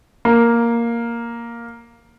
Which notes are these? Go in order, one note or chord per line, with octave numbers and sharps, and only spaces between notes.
A#3